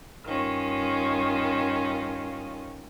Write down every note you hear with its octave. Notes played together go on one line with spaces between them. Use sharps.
G2 D#3 C#4 F4